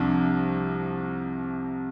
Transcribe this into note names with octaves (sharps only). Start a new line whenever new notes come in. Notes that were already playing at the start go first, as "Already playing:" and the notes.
Already playing: C2 C3 F3 D4